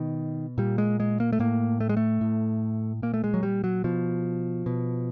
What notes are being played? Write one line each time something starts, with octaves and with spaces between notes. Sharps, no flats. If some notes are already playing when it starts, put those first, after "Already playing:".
Already playing: B2 D#3
A#2 G3
G#3
G#3
A#3
A3
A2 A#3
A3
G#3
A3
A2
A#2 A#3
A3
G#3
F#3
G3
F#3
B2 F3
B2